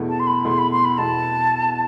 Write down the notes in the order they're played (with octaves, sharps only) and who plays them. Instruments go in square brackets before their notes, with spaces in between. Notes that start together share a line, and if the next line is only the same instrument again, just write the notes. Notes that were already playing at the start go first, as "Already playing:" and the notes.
Already playing: [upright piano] E2 B2 A3 E4
[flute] A5
C6
B5
[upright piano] E2 B2 A3 E4 [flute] C6
[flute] B5
C6
B5
[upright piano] E2 B2 A3 E4 [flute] A5